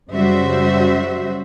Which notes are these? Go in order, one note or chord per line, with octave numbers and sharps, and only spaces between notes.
F#2 C#3 G3 F#4 C5 E5